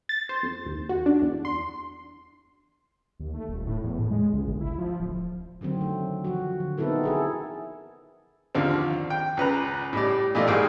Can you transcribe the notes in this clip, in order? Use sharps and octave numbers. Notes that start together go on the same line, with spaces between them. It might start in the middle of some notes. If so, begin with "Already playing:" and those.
A6
C5
F2
D#2
F#4
D4
E2
C6
D#2
A3
D#1
A2
E2
A2
G#3
C#2
G1
E4
F3
D1
D3 D#3 F#3 C4
A3
F3 F#4
D3
B3 C4 D#4 E4 A4 A#4
E4 G#4 A4
D#2 D3 F3 C4
G5
C#2 B4 A#5
A2 G3 D5
A#2 E3 A3 D5 D#5
C2 G#2 G#4 A#4 D5 G5